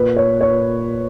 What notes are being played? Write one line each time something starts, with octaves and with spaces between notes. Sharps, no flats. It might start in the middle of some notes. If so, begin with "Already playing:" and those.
Already playing: A#2 B4
C#5
C#5